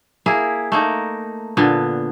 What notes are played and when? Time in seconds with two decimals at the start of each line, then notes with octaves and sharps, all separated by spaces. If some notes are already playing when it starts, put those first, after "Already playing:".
0.26 A#3 E4 G#4
0.72 A3 A#3 D#4
1.57 A#2 D3 B3